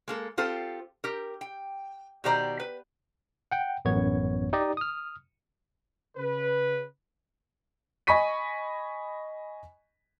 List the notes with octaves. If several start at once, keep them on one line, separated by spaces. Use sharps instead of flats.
G#3 A#3 A4
C4 F4 G4 A4 C5
G4 A#4
G5
B2 D#3 G4 C5 D5 A#5
B4
F#5 G5
A1 F#2 B3 C#5 G#6
D#4 G4 D5 D#5
D#6 F6
C#3 B4
D#5 G#5 B5 C#6 B6 D#7